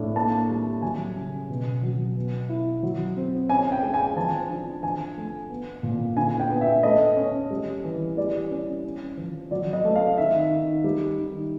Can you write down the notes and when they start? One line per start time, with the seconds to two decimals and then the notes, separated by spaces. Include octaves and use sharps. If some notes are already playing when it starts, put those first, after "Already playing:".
Already playing: A2 D4
0.15 A#3 A5
0.49 G3
0.82 F#3 G#5
1.16 C#3
1.50 B2
1.83 F#3
2.15 B3
2.49 E4
2.83 F#3
3.17 C4
3.49 C#4 G#5
3.72 G5
3.83 G#3
3.94 G#5
4.16 F3 A5
4.50 D4
4.83 F3 G#5
5.17 A3
5.49 B3
5.83 A#2
6.16 D3 G#5
6.40 G5
6.50 B3
6.61 E5
6.83 A3 D#5
7.16 C#4
7.51 G3
7.84 E3
8.17 G3 D5
8.51 C#4
8.84 C#4
9.17 F3
9.51 F#3 D5
9.73 D#5
9.85 A3
9.96 F5
10.18 D#3 E5
10.51 D#3
10.84 G3
11.18 D#3